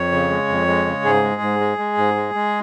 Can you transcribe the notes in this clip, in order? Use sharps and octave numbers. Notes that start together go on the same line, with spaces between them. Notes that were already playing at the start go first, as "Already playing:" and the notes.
Already playing: F2 C#5
C#3
G#3
F2
G#3
C#3
G#2 G#4
G#3
G#2
G#3
G#3
G#2
G#3
G#3